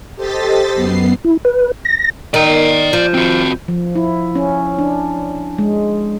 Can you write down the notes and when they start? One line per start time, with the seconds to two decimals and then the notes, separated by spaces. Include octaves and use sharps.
0.16 G4 A4 C5 D#5 A6 B6
0.74 F#2 B3 C7
1.24 E4
1.45 B4
1.85 A#6
2.34 D#3 D5 A#5
2.93 F3
3.14 C4 F#4
3.68 F3
3.95 E4
4.35 C#4
4.79 D4
5.59 G#3